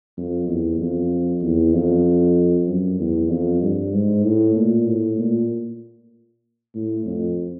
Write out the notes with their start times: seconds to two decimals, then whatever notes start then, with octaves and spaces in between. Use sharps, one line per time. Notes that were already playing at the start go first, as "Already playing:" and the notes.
0.17 F2
0.48 E2
0.80 F2
1.43 E2
1.74 F2
2.68 F#2
3.00 E2
3.30 F2
3.62 G2
3.94 G#2
4.24 A2
4.56 A#2
4.87 A2
5.19 A#2
6.75 A2
7.06 F2